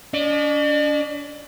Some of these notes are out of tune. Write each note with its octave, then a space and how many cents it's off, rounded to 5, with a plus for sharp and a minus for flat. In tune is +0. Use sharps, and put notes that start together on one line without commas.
D4 -40 D5 +45